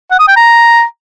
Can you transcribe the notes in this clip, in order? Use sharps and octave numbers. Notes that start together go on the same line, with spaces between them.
F#5
D#6
G5
A#5